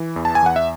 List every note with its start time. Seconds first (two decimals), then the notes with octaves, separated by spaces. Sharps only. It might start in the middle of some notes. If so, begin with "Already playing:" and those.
Already playing: E3
0.16 E2
0.25 A5
0.35 G#5
0.42 E2 F#5
0.56 E5